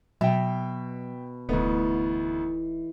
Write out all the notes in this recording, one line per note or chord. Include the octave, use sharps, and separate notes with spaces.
B2 F#3 E5 G5
D#1 D2 E3 A3 B3 D#4